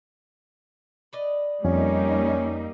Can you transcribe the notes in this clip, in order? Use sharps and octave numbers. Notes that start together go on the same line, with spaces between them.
B4 D5 D#5
F2 G3 A#3 C#4 D#4